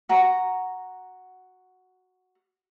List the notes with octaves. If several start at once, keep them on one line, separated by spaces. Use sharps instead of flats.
F#4 A#5